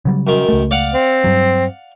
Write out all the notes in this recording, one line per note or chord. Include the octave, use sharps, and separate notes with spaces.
C#3 F#3 G3
F#2 D#3
C#2 A3
D5 F5 F#5
C4
G2 F#3